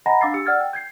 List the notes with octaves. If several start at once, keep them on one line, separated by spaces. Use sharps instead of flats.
D#5 F#5 G#5 A#5 B5 A#6
D4 F5 D6 E6 A6 C7
G4 E6 C#7
D5 F#5 E6 F6 G#6 A6
G5
G6 G#6 C7